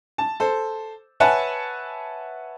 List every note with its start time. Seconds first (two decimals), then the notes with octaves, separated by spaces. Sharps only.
0.18 A5
0.40 A4 C5
1.20 B4 C#5 E5 F#5 G#5 A5